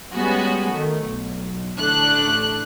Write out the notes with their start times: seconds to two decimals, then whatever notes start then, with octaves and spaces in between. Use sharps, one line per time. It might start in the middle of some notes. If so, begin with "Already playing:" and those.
0.13 G3 G#3 B3 C#4 F#4
0.72 D#3 A3
1.08 B1
1.79 A1 D3 A3 D4 F#6